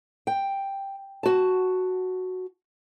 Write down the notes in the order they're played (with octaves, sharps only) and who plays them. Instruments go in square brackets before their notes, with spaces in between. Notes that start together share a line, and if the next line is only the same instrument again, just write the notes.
[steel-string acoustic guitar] G5
F#4 A5